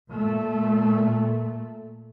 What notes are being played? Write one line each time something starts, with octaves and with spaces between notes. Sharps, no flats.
A#2 A3